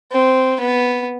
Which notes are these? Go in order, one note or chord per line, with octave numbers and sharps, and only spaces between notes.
C4
B3